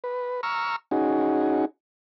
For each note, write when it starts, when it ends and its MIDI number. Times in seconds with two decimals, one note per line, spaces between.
0.04 0.41 71
0.43 0.76 82
0.43 0.76 85
0.43 0.76 88
0.43 0.76 89
0.91 1.65 61
0.91 1.65 63
0.91 1.65 66
0.91 1.65 68